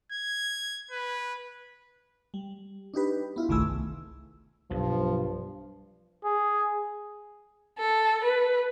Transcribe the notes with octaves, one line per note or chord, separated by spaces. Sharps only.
G#6
B4
G3
D4 D#4 G4 B4
B3 E4 F4
G1 C2 D#3 A3 G#4 E6
B1 G2 F3
G#4
A4
B4